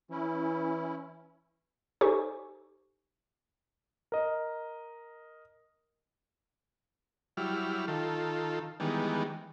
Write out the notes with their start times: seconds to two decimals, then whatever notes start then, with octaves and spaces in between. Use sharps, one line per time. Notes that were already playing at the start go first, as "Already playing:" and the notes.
0.11 E3 C#4 E4
2.01 D#4 G4 A4 C5 G#5 C#6
4.12 A#4 D#5
7.37 F#3 G3 E4 F6
7.88 D#3 F4 A4
8.80 D#3 E3 G3 G#3 B3